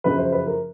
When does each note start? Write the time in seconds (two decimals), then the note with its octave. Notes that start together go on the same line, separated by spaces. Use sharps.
0.04 F#2 C#3 F3 B4
0.18 C5
0.32 B4
0.47 A#4